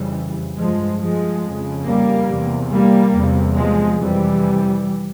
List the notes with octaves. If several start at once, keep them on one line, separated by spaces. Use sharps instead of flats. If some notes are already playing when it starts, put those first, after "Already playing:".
Already playing: F2 C#3 E3 G3
G2 F3 G#3
F3 G#3
F2 C#3
G3 A#3
E2 C3
G3 A#3
E2 C3
F3 G#3
F2 C3 E3 G3